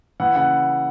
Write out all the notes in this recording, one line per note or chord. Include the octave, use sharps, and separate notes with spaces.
E3 F#5
C#3 F#5